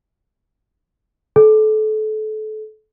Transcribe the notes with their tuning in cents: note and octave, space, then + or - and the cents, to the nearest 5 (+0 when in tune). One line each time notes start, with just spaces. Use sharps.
A4 -30